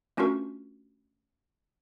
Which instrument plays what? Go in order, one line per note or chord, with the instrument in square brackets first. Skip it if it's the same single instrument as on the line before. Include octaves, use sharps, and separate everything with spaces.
[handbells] A3 C#4 D4 F4 F#4 A#4